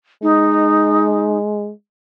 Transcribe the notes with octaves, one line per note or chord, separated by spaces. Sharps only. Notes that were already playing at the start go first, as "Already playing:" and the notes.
G#3 D#4